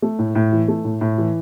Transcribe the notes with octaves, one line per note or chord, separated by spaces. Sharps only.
A3
A2
A2
E3
A3
A2
A2
E3